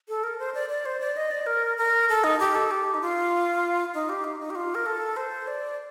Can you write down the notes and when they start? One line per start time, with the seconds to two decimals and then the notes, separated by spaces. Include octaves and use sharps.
0.08 A4
0.23 A#4
0.39 C5
0.54 D5
0.69 D5
0.85 C5
1.00 D5
1.17 D#5
1.31 D5
1.46 A#4
1.77 A#4
2.09 A4
2.24 D#4
2.39 G4
2.55 A4
2.71 G4
2.94 D#4
3.01 F4
3.94 D#4
4.09 G4
4.24 D#4
4.40 D#4
4.50 G4
4.55 F4
4.75 A#4
4.86 A4
5.16 C5
5.47 D5